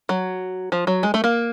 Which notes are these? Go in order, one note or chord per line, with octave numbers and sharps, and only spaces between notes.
F#3
F3
F#3
G#3
A3
A#3